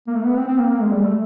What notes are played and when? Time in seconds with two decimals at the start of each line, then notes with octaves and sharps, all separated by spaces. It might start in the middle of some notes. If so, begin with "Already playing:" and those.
0.07 A#3
0.14 A3
0.25 B3
0.37 C4
0.47 C4
0.59 A#3
0.70 A#3
0.81 G#3
0.92 G3
1.03 A3